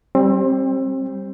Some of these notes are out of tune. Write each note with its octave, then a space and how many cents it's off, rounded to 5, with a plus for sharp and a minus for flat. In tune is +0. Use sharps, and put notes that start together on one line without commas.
G3 +0 C4 +30